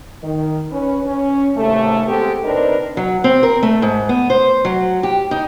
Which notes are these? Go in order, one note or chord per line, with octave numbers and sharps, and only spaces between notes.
D#3
C#4 B4
C#4
D#2 G#2 C3 A3
G#3 B3 C4 G4 A4
C3 C4 D4 D#4 A#4 B4
F#3
C4
A#4
A3
G#2
B3
C5
F#3
G4
D#4